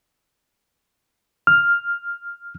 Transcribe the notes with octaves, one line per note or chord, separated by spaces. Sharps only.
F6